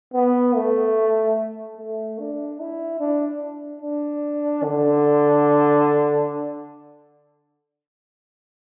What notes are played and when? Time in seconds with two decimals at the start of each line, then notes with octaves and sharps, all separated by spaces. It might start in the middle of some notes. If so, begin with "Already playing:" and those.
0.14 B3
0.56 A3
1.77 A3
2.19 D4
2.60 E4
3.00 D4
3.82 D4
4.64 D3